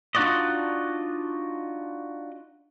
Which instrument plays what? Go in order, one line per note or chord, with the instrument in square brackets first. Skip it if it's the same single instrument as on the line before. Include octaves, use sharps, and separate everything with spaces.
[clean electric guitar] D4 D#4 F4 F#4 D5 D#5